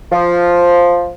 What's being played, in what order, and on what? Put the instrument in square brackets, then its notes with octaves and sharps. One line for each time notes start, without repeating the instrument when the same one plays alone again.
[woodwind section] F3